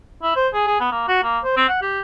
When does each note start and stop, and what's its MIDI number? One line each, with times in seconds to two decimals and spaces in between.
0.23 0.34 64
0.36 0.48 72
0.54 0.65 68
0.68 0.79 68
0.80 0.91 59
0.92 1.07 58
1.08 1.23 66
1.23 1.39 58
1.44 1.55 72
1.57 1.64 60
1.69 1.82 78
1.82 2.01 67